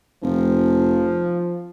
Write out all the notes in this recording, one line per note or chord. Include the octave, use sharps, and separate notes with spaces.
F1 F3